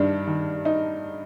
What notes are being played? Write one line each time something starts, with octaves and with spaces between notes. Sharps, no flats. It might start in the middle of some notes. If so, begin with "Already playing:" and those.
Already playing: G2 D#3 D4
D#3
D#4